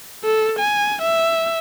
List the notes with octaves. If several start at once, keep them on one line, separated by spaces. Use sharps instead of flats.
A4
G#5
E5